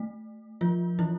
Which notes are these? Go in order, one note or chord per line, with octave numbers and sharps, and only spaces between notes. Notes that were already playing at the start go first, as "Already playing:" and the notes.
Already playing: A3
F3 F4
E3 E4